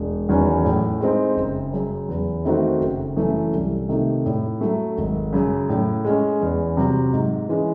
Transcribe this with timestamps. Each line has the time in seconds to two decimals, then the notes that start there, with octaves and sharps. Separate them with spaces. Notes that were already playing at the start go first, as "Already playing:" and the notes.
Already playing: E1
0.29 E2 D#3 F#3 C#4
0.65 A2
1.01 G#3 C4 D#4
1.37 F#1
1.73 F#2 C#3
2.08 E2
2.45 D#3 A3 C4 F#4
2.81 F#1
3.16 F#2 E3 A3 C#4
3.53 C2
3.89 C3 D#3 A3 D#4
4.26 A2
4.61 F#3 A3
4.98 G#1
5.33 F#2 C#3
5.69 A2
6.05 G#3 C#4
6.42 E2
6.77 C3 F#3
7.13 G#2
7.49 E3 G#3 C#4